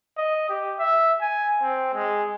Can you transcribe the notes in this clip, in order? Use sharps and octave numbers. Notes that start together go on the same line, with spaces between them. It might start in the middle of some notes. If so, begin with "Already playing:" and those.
D#5
G4
E5
G#5
C4
G#3